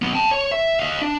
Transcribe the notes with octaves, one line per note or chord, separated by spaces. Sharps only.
F#3 B3
G5 A5
C#5
E5
D#5 F5
D4